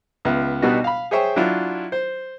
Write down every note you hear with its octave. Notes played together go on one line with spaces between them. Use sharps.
C#2 B3 E5
B2 G3 B3 D4 D#4 F#4
F5 B5
G#4 C5 C#5 E5 G5 C#6
F#3 D4 E4 F4
C5